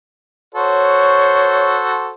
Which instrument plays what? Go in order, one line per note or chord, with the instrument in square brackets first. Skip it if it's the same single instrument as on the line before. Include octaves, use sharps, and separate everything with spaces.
[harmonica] F#4 A4 C5 [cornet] C#5